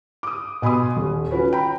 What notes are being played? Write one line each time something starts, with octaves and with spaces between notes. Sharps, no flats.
D6 D#6
B2 G#5 B5 C6 D#6
D#1
C#4 F#4 B4 C#5
G5 A#5 B5